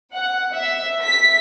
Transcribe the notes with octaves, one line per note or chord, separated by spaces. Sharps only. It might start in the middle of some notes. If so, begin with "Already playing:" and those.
F#5
E5
B6